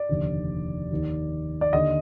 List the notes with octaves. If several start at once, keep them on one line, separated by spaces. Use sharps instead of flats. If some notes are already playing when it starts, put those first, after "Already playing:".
Already playing: D5
F1 D#2 D3
D#2 D#3
D5
D#2 D3 D#5